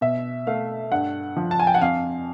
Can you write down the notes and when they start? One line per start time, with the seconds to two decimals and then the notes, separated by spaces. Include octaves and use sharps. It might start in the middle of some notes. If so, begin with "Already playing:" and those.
0.01 B2 E5
0.47 A3 F5
0.92 G2 F#5
1.37 F3
1.51 A5
1.60 G#5
1.67 G5
1.74 F#5
1.81 F2 F5